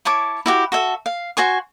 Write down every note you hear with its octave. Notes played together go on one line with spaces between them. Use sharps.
E4 C#5 A5 D6
E4 F#4 G4
F#4 A4 E5
F5
F#4 C5 G#5 C#6